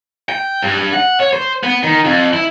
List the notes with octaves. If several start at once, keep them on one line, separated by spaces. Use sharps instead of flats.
G5
G2
F#5
C#5
C5
B3
D#3
F2
E4